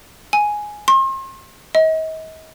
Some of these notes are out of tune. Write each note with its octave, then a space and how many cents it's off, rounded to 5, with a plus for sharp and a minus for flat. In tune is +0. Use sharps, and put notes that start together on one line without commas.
G#5 +5
C6 +40
D#5 +40